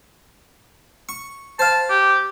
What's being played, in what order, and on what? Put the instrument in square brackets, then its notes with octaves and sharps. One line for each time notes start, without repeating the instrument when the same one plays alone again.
[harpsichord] C#6
[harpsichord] C5 F5 [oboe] A5
[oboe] G4